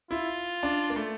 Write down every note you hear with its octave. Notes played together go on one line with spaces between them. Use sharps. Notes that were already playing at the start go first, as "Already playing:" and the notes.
E4 F4
D4
A#3
A3